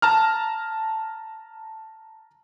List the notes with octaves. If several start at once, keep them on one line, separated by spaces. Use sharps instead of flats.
A5 A#5 F6